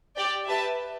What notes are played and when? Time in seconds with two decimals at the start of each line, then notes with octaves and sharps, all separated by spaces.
0.17 G4 D5 G5
0.48 G4 B4 E5 A5